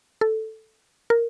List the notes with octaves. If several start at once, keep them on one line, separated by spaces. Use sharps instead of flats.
A4
A#4